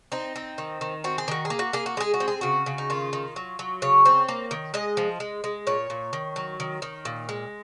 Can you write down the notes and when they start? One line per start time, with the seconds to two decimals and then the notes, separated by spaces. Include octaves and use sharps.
0.12 C4 D#4
0.36 C4
0.58 D#3
0.81 D#3
1.04 C4 F#4
1.18 G#4
1.28 D#3 F#4
1.45 G#4
1.50 A#3
1.59 F#4
1.73 A#3 G#4
1.86 F#4
1.97 G#3 G#4
2.14 F#4
2.20 C4
2.28 G#4
2.41 C#3 F#4
2.66 C#3
2.78 D#4
2.90 D#3 F4
3.13 D#3
3.36 F#3
3.59 F#3
3.82 C#3 C#5
4.06 C4
4.28 A#3
4.51 D#3
4.74 G#3 D#5
4.97 F3
5.20 G#3
5.44 G#3
5.67 A#2 C#5
5.90 A#2
6.13 D#3
6.36 F#3
6.60 D#3
6.82 D#3
7.05 A#2
7.29 G#3